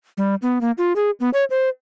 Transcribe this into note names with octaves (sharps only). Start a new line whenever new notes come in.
G3
B3
A#3
F4
G#4
B3
C#5
C5